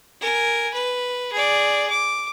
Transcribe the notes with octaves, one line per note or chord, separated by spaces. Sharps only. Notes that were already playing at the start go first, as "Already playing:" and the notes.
A#4 G#5
B4
G#4 D5
D6